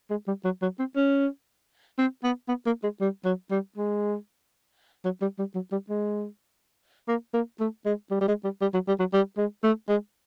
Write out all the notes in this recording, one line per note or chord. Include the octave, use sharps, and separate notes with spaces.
G#3
G3
F#3
F#3
C4
C#4
C4
B3
B3
A#3
G#3
G3
F#3
G3
G#3
F#3
G3
G3
F#3
G3
G#3
A#3
A#3
A3
G#3
G3
G3
G#3
G3
G3
F#3
G3
F#3
G3
G#3
A3
G#3